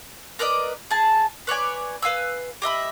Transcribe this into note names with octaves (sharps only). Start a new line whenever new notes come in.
A#4 B4 D5 D#5
G#4 A5
B4 C#5 D5 G#5
B4 F5 G#5 E6
G4 D#5 E5 B5